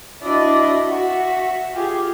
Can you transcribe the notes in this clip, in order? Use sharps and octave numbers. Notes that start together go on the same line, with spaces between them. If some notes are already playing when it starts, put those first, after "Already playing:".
D4 E4 F#4 D5 D#5
F#4 E5
F4 G4 G#4